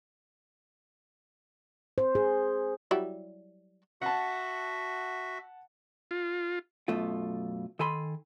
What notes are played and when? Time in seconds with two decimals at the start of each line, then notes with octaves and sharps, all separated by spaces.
1.98 C5
2.15 G#4
2.91 F#3 G3 E4
4.02 F#4 E5 F#5 A5
6.11 F4
6.88 F#2 B2 A3 F4
7.79 D#3 A4 G#5 B5 C6